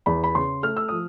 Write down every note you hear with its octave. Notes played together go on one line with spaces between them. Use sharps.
E2 B5
B5
C#3 C6
A3 F6
E6
F3 D#6